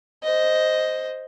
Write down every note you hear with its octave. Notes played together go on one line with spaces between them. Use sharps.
C5 D#5